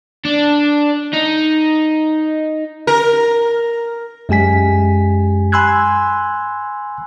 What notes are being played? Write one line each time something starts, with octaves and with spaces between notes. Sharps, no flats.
D4
D#4
A#4
F#2 G#3 G4 G#5 B6
G#5 B5 C6 E6 F#6 G#6